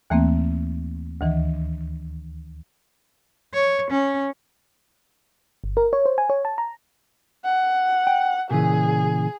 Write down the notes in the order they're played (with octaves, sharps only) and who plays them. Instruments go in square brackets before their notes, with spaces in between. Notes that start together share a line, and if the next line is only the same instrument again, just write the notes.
[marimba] D#2 E3 A3 A#3 C4
D2 D#3 E3
[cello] C#5
C#4
[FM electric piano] G1
A#4
C#5
C5
G#5
C#5
A5
A#5
[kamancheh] F#5
[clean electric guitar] G5
[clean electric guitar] A#2 C#3 E3 [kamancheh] G#4